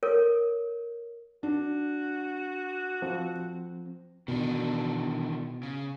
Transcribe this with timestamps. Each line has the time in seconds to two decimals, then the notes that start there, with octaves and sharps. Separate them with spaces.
0.03 A4 A#4 C#5
1.43 D4 F#4
3.02 F3 C4
4.28 B2 D#3 E3 D4
5.63 C#3